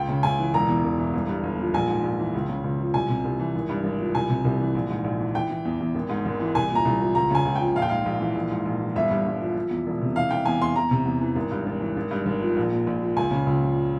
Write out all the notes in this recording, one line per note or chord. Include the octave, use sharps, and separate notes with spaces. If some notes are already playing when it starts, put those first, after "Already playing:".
Already playing: C#2 G5
C#3
C#2 G#5
E3
E1 A#5
E2
E1
E3
G1
G2
G1
F3
A#1 G#5
G#2
A#1
E3
C#2
C#3
C#2
F3
C2 G#5
C3
C2
E3
G#1
G2
G#1
F3
C2 G#5
C3
C2
E3
A#1
G#2
A#1
E3
E3 G5
E3
E2
E2
G#1
G#2
G#1
E3
C2 G#5
A#2
A#5
C2
F3
C#2 A#5
C#3 G#5
C#2
F3 G5
A#1 F5
G5
G#2 F5
A#1
E3
A#1
G#2
A#1
E3
G1 E5
G2
G1
F3
F3
E2
E1
C3
E3 F5
E3 G5
E2 G#5
E2 C6
E2 A#5
C3
E2
E3
G#1
G2
G#1
E3
G#1
G2
G#1
F3
A#1
A#2
A#1
F3
C#2 G#5
C#3
C#2
F3